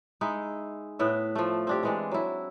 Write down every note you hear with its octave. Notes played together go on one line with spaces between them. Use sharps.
G#3 D#4 E4
A2 B3 E5
F3 A3
C4 D4 G4
E3 G#3 D4
F#3 E4